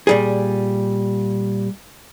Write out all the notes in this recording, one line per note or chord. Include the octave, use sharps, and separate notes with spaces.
A#2 G3 G#4